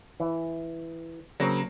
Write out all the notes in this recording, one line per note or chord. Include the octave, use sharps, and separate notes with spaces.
E3
C#3 F#3 A#3 C4